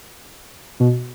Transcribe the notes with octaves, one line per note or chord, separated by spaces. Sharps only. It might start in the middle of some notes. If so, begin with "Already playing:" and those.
B2